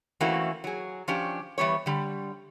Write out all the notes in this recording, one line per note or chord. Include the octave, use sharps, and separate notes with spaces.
E3 A3 A#3 C4 C#4 F#4
F#3 G#4
F3 C#4 D4 G4
E3 G3 B3 C#5
D3 G3